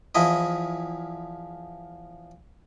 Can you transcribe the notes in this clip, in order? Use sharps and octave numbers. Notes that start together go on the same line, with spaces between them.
E2 F3 E4 D#5